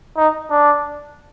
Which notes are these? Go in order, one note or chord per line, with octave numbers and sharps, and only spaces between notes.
D#4
D4